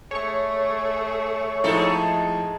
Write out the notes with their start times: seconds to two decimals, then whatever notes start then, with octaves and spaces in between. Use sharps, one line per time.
0.11 A3 G#4 C#5 C#6
1.64 A2 F3 G#3 D#4 A4